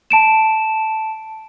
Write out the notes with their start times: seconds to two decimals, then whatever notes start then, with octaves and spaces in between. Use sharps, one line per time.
0.10 A5 D7 E7